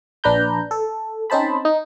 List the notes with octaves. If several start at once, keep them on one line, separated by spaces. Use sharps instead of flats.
A#1 D4 B4 A#5 G6
A4
C4 C#4 D#4 C5 A5 B5
D#4